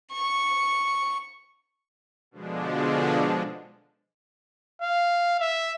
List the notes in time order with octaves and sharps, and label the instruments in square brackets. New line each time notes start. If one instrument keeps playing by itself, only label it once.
[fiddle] C#6
[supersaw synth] B2 D3 F3 G#3 D4
[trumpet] F5
E5